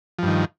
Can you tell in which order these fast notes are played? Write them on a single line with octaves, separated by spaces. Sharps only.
F3 G2 D#3